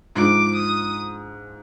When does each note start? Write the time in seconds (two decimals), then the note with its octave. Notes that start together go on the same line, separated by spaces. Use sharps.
0.15 G#2 F3 G#3 D6
0.56 D#6